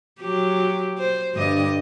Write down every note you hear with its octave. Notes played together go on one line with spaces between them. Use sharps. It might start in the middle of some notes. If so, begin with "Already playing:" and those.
F#3 G4
C5
G2 D3 D#5